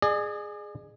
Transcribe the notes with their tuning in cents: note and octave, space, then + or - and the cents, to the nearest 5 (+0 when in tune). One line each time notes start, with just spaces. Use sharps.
G#4 +0 D5 +45